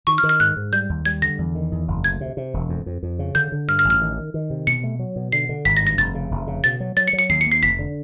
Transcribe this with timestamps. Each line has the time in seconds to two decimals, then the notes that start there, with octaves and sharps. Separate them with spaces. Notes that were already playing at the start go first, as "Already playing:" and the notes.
0.07 D#3 C#6
0.18 F6
0.23 D#3
0.29 F6
0.40 G#2 F#6
0.56 G#2
0.73 G3 G6
0.89 D#2
1.06 G3 G#6
1.22 D3 A#6
1.38 E2
1.55 D#3
1.72 E2
1.88 F#1
2.04 D2 G#6
2.21 C3
2.37 C3
2.54 E1
2.69 F2
2.86 F2
3.03 F2
3.19 C#3
3.35 D3 G6
3.52 D3
3.68 G2 F6
3.79 F6
3.85 A1
3.90 F6
4.02 D#3
4.17 D#3
4.34 D#3
4.50 C3
4.67 B2 C#7
4.84 A3
4.99 F#3
5.16 B2
5.32 D3 C7
5.49 D3
5.65 G#1 B6
5.77 A#6
5.82 G2
5.87 A#6
5.98 F1 A6
6.15 C#3
6.31 F1
6.47 C#3
6.64 B2 A6
6.80 F#3
6.97 F#3 A6
7.08 C#7
7.13 F#3
7.19 C#7
7.29 D#2 C7
7.41 C#7
7.46 D#2
7.52 C7
7.62 F1 B6
7.79 D3